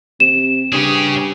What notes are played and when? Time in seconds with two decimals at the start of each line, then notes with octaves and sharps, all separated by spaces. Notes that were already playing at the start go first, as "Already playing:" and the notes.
0.20 C3 E7
0.73 G2 C#4 G4 G#4